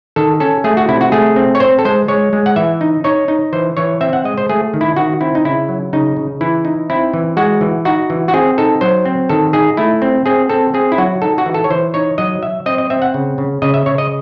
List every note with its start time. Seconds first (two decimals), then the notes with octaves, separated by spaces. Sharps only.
0.16 D#3 A4
0.40 C#4 A4
0.64 A3 G#4
0.77 F#4
0.88 C3 E4
1.01 F#4
1.12 A3 G#4
1.36 C4
1.55 C#5
1.60 C4 C5
1.79 A4
1.85 G#3 C5
2.08 G#3 C#5
2.33 G#3
2.46 F#5
2.56 E3 E5
2.81 D#4
3.04 D#4 C#5
3.28 D#4
3.53 E3 C5
3.77 E3 C#5
4.01 C4 E5
4.13 F#5
4.24 G#3 D#5
4.38 C5
4.49 A3 G#4
4.74 D#3
4.81 E4
4.96 D#3 F#4
5.21 C4 E4
5.35 D#4
5.45 C#3 E4
5.69 F#3
5.93 C#3 D#4
6.17 C#3
6.41 E3 E4
6.65 D#4
6.90 C4 E4
7.14 E3
7.37 G#3 F#4
7.61 E3
7.85 D#4 F#4
8.10 E3
8.28 F#4
8.34 C4 G#4
8.58 D#4 A4
8.81 F#3 C5
9.05 C4
9.29 D#3 A4
9.53 D#4 G#4
9.77 A3 E4
10.02 C4
10.26 C4 G#4
10.49 C4 A4
10.74 C4 G#4
10.92 E4
10.98 F#3 F#4
11.22 D#4 A4
11.38 F#4
11.46 E3
11.54 A4
11.64 C#5
11.70 E3 C5
11.94 D#4 C#5
12.18 F#3 D#5
12.42 F#3 E5
12.66 C4 D#5
12.78 D#5
12.90 C4 E5
13.02 F#5
13.14 C#3
13.38 C#3
13.62 C#3 D#5
13.74 E5
13.86 C#3 C#5
13.98 D#5